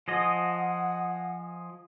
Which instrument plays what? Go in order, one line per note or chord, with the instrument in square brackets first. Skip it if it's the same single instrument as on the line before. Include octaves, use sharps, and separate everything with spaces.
[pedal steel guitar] F3 G#4 D#5 [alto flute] F#5